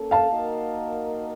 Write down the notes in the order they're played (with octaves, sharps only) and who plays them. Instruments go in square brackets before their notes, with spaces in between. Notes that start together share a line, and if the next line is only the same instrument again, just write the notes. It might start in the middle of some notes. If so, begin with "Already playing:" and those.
Already playing: [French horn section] A#3 C#4 A4
[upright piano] F5 A5
[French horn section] A#3 D#4 F#4 A#4 D#5